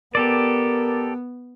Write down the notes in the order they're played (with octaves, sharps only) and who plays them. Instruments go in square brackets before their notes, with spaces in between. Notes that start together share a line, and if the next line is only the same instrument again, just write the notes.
[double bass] B3 [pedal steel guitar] G4 A4 D5 [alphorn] A#4